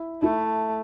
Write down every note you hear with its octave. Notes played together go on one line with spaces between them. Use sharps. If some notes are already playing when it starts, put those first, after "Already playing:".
Already playing: E4
A3 E4